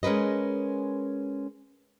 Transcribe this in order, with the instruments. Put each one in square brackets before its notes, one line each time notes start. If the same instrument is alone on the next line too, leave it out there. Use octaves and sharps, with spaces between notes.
[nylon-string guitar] G#3 C#4 A#4 B4 D#5